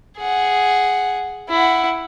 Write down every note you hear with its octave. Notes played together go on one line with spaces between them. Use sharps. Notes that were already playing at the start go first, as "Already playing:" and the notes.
G#4 F#5
E4 F#5